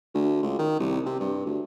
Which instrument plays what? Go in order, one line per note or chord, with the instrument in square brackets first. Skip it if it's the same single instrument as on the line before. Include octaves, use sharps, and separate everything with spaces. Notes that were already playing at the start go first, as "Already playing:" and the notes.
[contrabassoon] D2
C#2
D#3
C2
C3
G2
D2